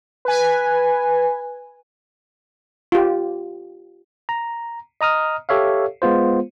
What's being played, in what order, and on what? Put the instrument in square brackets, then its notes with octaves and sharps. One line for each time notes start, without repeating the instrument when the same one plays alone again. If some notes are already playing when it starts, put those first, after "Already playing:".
[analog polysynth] B4 G#5
[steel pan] F4 G4
[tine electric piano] A#5
D#5 A#5 D#6 F6
G4 A4 C#5 E5 F5
G#3 B3 F4 C5